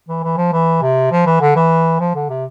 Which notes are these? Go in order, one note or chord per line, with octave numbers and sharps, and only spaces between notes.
E3
E3
F3
E3
C3
F3
E3
D3
E3
F3
D3
C3